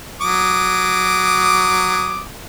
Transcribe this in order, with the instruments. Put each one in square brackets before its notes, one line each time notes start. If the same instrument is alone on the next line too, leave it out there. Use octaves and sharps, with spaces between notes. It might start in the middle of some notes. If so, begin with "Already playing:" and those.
[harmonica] F#3 D6 D#6